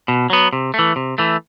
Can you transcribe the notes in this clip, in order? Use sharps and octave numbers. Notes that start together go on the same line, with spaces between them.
B2
F#3 B3
C3
E3 A3
C3
E3 A3